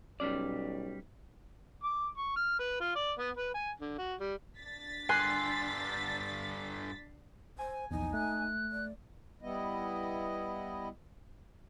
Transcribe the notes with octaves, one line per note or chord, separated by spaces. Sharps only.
B1 G3 C#4 D5
D6
C#6
F6
B4
F4
D5
B3
B4
G#5
D3
F#4
G3
D4 A6 B6
G2 D3 G#5 C6 F#6 C7
C5 G#5
A#1 E2 D#4
A3 F#6
D5
G3 B3 E4 D#5